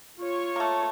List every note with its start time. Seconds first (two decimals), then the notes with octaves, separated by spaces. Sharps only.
0.18 F4 C#5
0.56 A3 A#3